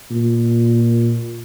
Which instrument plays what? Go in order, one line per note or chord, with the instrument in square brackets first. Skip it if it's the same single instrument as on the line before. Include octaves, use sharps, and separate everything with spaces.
[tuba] A#2